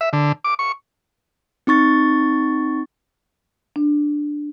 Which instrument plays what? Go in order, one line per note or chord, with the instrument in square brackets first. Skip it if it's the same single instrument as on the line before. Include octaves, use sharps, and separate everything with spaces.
[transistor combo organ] E5
D3
D6
C#6
[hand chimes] C4 D#4 C#6 A6
[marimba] D4